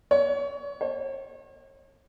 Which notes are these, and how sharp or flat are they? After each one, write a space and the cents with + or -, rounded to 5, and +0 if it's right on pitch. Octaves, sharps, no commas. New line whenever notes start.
C#5 +30
C#5 -40